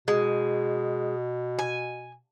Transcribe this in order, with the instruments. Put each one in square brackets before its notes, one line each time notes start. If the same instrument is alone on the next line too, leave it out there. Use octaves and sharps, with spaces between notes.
[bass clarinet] B2 [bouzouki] G#3
[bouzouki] G#5